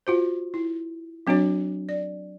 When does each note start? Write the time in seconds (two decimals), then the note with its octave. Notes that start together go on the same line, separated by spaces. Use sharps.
0.07 F4 F#4 C5
0.54 E4
1.27 F#3 C4 D4 F#4 C#5
1.89 D5